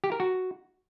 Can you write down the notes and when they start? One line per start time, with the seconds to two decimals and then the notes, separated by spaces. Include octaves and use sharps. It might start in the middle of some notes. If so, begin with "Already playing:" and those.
0.04 G4
0.12 A#4
0.20 F#4